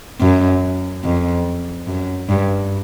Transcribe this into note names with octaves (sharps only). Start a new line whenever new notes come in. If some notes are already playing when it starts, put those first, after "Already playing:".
F#2
F2
F#2
G2